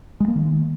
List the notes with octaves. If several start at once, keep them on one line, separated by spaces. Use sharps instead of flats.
G#3
A#3
D#3